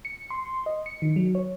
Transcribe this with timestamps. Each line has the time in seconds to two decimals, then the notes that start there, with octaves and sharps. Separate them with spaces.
0.05 C#7
0.30 C6
0.66 D#5
0.86 C#7
1.02 D#3
1.16 F#3
1.35 C#5